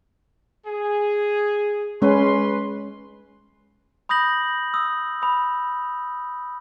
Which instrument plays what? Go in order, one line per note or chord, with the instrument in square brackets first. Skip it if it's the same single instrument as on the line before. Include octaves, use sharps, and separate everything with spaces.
[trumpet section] G#4
[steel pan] G#3 C#4 [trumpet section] B4 C6
[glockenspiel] B5 D#6 G6 A#6 F#7
D#6 E6
B5 D#6